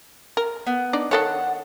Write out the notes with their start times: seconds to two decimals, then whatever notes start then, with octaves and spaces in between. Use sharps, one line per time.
0.37 A#4
0.67 B3
0.93 D4 D#4 D5
1.11 D#3 A4 C#5 F#5